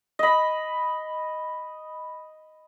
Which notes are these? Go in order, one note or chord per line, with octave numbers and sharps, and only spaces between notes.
D#5 B5